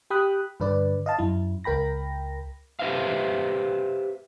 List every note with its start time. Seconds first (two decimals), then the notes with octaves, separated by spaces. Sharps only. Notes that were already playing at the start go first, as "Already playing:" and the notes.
0.10 G4 G5 B5 D#6 F#6
0.60 G2 D3 B4 D5
1.06 D#5 F5 A5
1.19 F#2 E4
1.64 C#2 A#4 G5 B5 A#6
2.79 G4 B4 C5 E5 F5